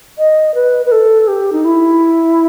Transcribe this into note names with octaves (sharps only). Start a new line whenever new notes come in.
D#5
B4
B4
A4
G4
D#4
E4